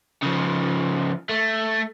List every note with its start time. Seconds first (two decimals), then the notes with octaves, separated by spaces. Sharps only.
0.23 C#3 F3
1.29 A3